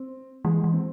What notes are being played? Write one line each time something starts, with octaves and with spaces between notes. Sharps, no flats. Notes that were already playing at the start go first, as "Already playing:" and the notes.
Already playing: C4
E3 G#3
E3
C4